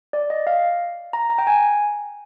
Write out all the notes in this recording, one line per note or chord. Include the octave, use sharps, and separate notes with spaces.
D5
D#5
F5
A#5
A#5
G5
G#5